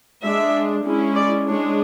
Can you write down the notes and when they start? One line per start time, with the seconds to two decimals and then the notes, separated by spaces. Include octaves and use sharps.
0.23 G#3 D4 E5
0.84 G#3 C#4 E4
1.15 D5
1.47 G#3 D4 C#5